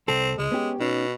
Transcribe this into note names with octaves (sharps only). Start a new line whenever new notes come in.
C2 C4 A4
C#2 G#3
B3 C#4 G4
B2 C#4 D#4